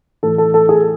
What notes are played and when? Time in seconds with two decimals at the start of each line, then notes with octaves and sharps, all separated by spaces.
0.23 A2 E3 A4
0.38 A4
0.54 A4
0.69 G#4